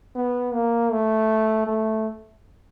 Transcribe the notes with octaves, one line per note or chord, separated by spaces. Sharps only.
B3
A#3
A3
A3